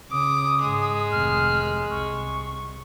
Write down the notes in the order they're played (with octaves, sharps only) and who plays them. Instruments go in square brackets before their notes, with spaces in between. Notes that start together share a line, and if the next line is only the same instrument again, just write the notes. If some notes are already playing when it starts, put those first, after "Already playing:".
[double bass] C#3 [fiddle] D6 [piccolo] D#6
[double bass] G#2 [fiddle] G#3
[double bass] F1 D#3 [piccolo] F6
[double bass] C2 [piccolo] C#6